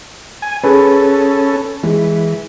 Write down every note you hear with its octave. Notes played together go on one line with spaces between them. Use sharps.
G#5
C#4 G#4 A4 B4
E3 G#3